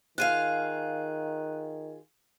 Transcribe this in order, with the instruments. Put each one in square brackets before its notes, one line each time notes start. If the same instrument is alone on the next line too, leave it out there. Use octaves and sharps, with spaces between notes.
[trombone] D#3 [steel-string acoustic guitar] F4 G#4 F5 [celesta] F#6 D#7